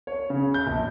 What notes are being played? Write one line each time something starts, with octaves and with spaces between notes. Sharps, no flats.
C#5
C#3
G6
A#1